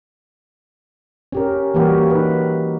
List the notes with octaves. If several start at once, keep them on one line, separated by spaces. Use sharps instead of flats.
C#4 G4 A#4
E3 G3 A#3 F#4 G4 A#4
D#4 B4